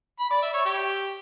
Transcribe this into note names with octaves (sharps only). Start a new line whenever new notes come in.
B5
D5
E5
C#5
G4